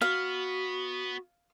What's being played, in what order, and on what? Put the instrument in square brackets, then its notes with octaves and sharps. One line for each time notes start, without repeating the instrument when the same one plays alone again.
[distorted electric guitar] B3 [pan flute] F#4 [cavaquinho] F5